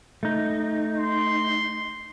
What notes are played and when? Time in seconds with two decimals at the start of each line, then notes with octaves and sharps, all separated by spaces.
0.23 A3 D#4
0.97 C6